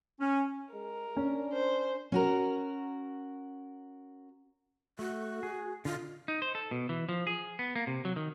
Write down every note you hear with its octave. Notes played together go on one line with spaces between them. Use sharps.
C#4
G#3 A#4
C#4 D4
C5
C#4 F#4 A#4
A3 F#4
G#4
D3 F4 D#5
D#4
C5
A4
B2
E3
F3
G#4
B3
A#3
C3
F#3
D#3